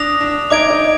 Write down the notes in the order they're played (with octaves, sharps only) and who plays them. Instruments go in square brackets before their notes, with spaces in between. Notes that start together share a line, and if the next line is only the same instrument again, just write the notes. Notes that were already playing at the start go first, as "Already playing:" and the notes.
Already playing: [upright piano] D4 [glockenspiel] D#6 A#6 F7
[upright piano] D4
[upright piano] D#4 [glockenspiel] D6 G#6 D7
[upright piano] D#4